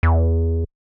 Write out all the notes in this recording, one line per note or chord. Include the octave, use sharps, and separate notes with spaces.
E2